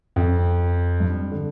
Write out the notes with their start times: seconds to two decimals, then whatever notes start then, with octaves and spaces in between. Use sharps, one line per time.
0.16 F2
1.00 G2
1.31 D3